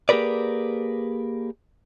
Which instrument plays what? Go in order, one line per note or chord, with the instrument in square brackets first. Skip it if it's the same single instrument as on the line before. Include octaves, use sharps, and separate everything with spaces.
[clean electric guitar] A#3 G4 G#4 A#4 B4 D5